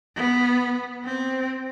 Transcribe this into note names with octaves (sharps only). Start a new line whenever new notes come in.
B3
C4